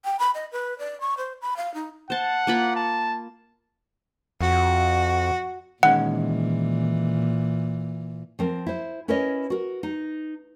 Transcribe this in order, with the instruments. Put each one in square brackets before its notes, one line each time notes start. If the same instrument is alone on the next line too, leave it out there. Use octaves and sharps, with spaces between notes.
[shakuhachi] G5
B5
D#5
B4
D5
C#6
C5
B5
F5
D#4
[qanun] C5 A5 [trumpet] F#5
[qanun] A#3 F4 B5
[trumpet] A5
[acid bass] F2 [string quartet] F#4
[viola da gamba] A#2 E3 [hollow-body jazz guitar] D#3 G#3 C#4 [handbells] F#5
[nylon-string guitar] F3 C4 A#4
E4 C5
C#4 E4 A#4 B4 C#5 D#5
F#4 A#4
D#4